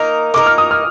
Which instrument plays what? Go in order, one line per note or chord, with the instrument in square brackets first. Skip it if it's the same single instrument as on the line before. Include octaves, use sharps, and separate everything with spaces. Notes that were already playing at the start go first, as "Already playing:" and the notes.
Already playing: [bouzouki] A#3 D#4 A#4 [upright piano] D#6
[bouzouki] A#3 D#4 A#4 [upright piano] D6
[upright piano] F6
D#6
F6